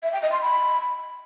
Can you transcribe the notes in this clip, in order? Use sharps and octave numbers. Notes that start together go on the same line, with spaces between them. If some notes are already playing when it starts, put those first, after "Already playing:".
E5
G5
D#5
C6
B5